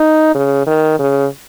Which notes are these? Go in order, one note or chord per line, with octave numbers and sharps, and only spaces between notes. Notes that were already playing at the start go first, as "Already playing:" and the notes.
Already playing: D#4
C#3
D#3
C#3